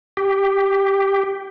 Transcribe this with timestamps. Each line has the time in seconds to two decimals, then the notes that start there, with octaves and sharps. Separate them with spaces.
0.17 G4